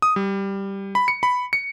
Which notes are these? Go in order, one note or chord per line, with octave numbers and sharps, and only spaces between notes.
D#6
G3
B5
C#7
B5
C#7